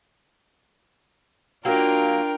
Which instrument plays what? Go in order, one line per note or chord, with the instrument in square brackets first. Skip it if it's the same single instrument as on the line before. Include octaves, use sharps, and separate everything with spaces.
[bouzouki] F#3 A#3 [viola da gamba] D4 F4 [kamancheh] A#4 G5